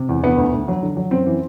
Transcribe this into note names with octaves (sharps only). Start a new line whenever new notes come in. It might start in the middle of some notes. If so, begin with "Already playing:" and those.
Already playing: C3
E2
D3 B3
D2
D2
F#3
D3
F#3
F#2 C4
E3